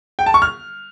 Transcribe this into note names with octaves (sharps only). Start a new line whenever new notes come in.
G5
A5
C#6
F6